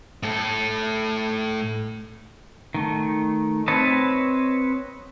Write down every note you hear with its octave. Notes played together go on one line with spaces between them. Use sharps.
A2 A4
D#3 A3
C4 B4 C#5 D#5 A5